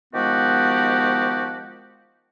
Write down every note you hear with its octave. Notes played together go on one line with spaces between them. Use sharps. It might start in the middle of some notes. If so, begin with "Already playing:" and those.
D#3 F3 G#3 B3 F#4 G4